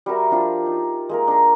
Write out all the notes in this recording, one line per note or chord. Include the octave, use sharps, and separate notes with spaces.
G3 F#4 A#4 E5
F3 D4 F4 G4
D#4
G#3 A#3 A#4
D4 A#5